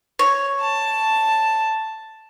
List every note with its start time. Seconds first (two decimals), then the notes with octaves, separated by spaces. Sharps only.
0.19 C#5
0.60 A5